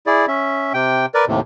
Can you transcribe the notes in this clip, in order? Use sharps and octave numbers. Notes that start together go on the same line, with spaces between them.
E4 G#4 D5
C#4 E5
C3 G5
A#4 B4 D5
D#2 A2 C3